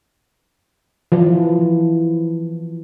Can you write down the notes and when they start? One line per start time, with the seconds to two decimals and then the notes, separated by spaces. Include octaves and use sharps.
1.12 E3 F3